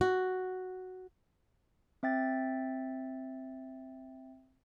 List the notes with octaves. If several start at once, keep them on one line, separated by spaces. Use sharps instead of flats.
F#4
C4 E5 G5 A6